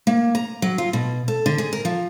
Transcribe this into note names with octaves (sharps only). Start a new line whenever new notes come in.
A#3
A#5
F#3
F4
B2
A4
D3
G#4
A#4
F3